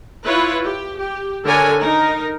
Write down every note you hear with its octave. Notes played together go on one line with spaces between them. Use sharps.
E4 F4 B4 C#5
G4
G4
D3 D4 A4 A#4 C#5 G#5
D#4 A#4